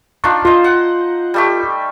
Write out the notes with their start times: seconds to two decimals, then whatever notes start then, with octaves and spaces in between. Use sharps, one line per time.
0.24 D4 D#4 F4 C#6
0.45 F4 C5 D#5
0.64 F#5
1.34 G3 A3 G4